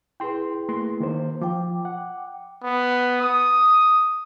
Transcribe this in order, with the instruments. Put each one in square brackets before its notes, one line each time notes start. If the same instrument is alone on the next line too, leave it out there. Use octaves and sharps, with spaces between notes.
[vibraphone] E4 G#4 B4 [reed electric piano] G5 C6
[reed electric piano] A3 A#3 C6
D#3 A#3 C5
[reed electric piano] F3 [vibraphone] G5 D6
[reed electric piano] F#5
[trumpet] B3
D#6